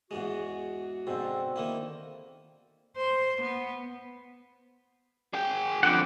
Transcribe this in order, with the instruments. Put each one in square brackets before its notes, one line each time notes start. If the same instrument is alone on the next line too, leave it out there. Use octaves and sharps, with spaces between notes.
[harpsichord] E2 G#2 G#3 [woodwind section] F#4
[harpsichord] G#2 B2 [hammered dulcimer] D3 C4
[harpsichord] D#3 A#3 E4
[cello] C5
B3
[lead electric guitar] G#4 G5
[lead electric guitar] F2 D3 [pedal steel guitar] F#5 G5 D6